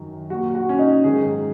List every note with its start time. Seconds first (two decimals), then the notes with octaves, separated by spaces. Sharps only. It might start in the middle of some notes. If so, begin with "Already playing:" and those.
Already playing: F#2 D#3 F#3
0.30 A#2 F#3 F#4
0.55 F#4
0.69 C#4
0.79 D#4
1.04 G#2 D#3 F#3 G#4